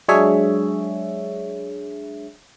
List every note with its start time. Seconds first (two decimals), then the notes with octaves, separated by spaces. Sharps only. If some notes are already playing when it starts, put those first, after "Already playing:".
0.08 F#3 G#3 D4 G#4 C#5 E5